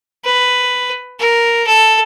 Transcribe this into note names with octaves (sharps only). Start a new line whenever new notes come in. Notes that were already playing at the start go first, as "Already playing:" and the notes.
B4
A#4
A4